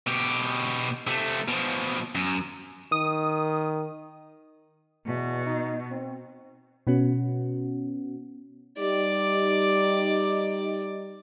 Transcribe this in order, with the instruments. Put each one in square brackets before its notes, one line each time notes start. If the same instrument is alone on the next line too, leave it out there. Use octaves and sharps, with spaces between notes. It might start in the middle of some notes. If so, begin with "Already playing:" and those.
[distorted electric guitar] B2 G4
C3 A3
B2 F3
F#2
[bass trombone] D#3 [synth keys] D#6
[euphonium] E2 [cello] B2
[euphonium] D#4
C4
[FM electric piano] B2 B3 C#4 F#4
[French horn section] G3 D#4 G4 [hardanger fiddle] D5 D6